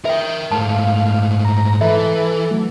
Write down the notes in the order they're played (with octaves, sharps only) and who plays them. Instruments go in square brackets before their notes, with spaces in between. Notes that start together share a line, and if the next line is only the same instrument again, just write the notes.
[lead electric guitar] A#4 G5 [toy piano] E5
[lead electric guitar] G#2 A3 [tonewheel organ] F5 [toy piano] A5
[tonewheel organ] A#5
[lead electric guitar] E3 [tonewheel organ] A4 [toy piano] E5
[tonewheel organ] F#3 A3